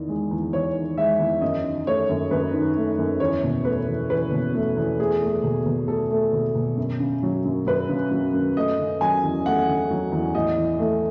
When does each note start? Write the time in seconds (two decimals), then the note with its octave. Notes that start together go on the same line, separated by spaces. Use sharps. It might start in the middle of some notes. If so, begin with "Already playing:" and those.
Already playing: E2 D#3
0.08 G#3
0.31 E2
0.53 E2 C#5
0.75 D#3
0.97 G#3 E5
1.20 E2
1.42 F#2 D#5
1.64 D#3
1.86 A3 C#5
2.09 F#2
2.31 F#2 B4
2.53 D#3
2.76 A3
2.98 F#2
3.20 E2 C#5
3.43 B2
3.65 A3 B4
3.88 E2
4.10 E2 B4
4.32 B2
4.55 A3
4.77 E2
4.99 A3 G#4
5.22 A3
5.43 B2
5.66 B2
5.88 A3 A4
6.10 A3
6.33 B2
6.55 B2
6.77 F#2
7.00 C#3
7.23 F#3
7.45 F#2
7.66 F#2 B4
7.89 C#3
8.11 F#3
8.34 F#2
8.56 A3 D#5
8.79 C#3
9.01 F#3 G#5
9.23 E2
9.46 A3 F#5
9.69 C#3
9.90 F#3
10.12 E2
10.35 A2 D#5
10.57 E3
10.79 A3